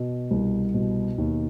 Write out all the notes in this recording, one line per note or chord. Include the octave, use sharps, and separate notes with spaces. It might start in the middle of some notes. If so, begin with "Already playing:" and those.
Already playing: B2
C2
B2
D#2